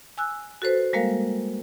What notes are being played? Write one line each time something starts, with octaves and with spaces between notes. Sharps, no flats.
G#5 E6 F#6
F#4 A4 B4 C5
G3 G#3 A#3 A#4 F5